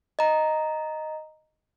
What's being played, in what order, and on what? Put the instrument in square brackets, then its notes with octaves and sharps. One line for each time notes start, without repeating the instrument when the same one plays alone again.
[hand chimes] D#5 A#5